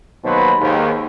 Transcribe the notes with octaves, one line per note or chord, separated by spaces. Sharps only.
D#2 B2 F#3 D#4 B4 C5
D#2 G#2